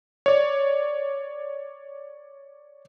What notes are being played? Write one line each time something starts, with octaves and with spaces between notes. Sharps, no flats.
C#5 D5